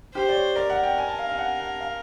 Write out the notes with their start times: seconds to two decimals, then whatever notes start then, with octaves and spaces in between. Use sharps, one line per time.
0.15 G4 C5
0.29 D5
0.35 C#5
0.56 A#4 D5
0.70 F#5
0.83 G5
0.98 G#5
1.08 A5
1.19 F5
1.29 F5
1.38 F#5
1.60 F#5
1.80 F5